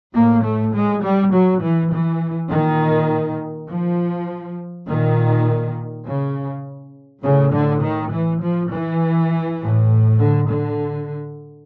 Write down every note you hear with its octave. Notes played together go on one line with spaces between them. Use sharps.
A2 A#3
A3
G#3
G3
F#3
E3
E3
A#2 D#3
F3
A#2 D#3
C#3
A2 C#3
D3
D#3
E3
F3
E3
A2
D3
D3